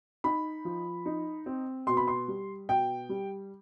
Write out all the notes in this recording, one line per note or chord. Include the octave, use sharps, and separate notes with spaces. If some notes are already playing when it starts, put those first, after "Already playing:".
D#4 B5
F3
D#4
C4
B2 C6
B5
C6
G3
B2 G5
G3